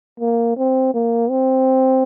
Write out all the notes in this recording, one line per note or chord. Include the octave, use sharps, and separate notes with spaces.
A#3
C4
A#3
C4